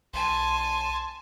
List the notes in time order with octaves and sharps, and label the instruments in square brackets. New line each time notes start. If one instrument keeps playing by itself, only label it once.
[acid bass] B1 [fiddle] G#5 A5 [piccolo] C6